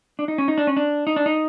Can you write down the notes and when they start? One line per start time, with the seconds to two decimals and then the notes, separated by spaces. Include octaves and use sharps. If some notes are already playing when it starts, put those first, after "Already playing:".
0.19 D4
0.28 D#4
0.38 C#4
0.48 D#4
0.58 D4
0.67 C#4
0.77 D4
1.07 D#4
1.16 D4
1.26 D#4